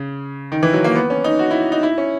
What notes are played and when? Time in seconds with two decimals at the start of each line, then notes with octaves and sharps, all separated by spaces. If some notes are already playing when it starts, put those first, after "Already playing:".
Already playing: C#3
0.52 D#3
0.63 E3
0.73 F#3
0.84 A#3
0.95 B3
1.10 C#4
1.24 D#4
1.39 F#4
1.51 E4
1.72 D#4
1.83 E4
1.98 C#4